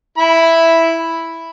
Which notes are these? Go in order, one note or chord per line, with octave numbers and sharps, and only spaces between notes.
E4 B5